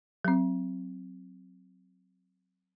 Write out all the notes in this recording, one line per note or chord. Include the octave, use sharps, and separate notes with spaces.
F#3 C4